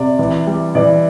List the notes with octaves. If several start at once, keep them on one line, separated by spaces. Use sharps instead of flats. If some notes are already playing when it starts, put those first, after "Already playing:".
Already playing: C3 D5
E3
G3
E3 D5